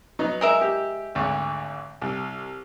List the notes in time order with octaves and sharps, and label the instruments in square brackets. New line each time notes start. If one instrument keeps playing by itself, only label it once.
[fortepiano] F#3 B3 D#4
[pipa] G#3 A#4 E5
[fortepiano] G4
G#1 D2 C#6
C2